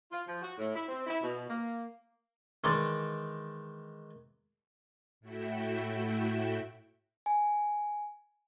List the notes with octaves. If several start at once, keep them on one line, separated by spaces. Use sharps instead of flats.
F4
F3
F#4
A2
E4
C4
E4
B2
A#3
D#3 E3 G#3 D#4 D5
A2 A3 E4 F#4 E5 G5
G#5